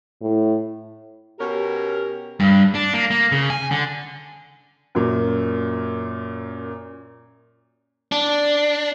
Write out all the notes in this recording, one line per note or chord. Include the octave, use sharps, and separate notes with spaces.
A2
B2 C#4 G4 A#4
G2
D4
A#3
A#3
C#3
G#5
D3
F#2 A#2
D4